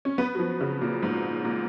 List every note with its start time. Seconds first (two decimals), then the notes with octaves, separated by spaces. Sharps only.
0.05 C#4
0.18 B3
0.35 F#3
0.39 F3
0.61 C#3
0.82 A#2
1.02 G#2
1.45 A#2